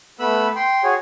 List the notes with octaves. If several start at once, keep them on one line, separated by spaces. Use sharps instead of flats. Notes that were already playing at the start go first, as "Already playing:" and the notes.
A3 B3 B4 B5 E6
G5 C6
F#4 G#4 C#5